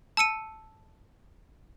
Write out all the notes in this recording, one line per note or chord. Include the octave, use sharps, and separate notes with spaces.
A5 E6 C#7 D#7